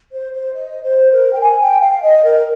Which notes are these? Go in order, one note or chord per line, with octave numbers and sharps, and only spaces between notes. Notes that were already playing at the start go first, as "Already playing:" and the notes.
C5
C5
D#5
C5
A#4
G5
G#5
G5
F5
D#5
A#4